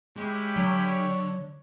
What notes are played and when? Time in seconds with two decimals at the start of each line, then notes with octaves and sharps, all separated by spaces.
0.16 G#3 C#4 E4 G4
0.56 D3 F#3 C#5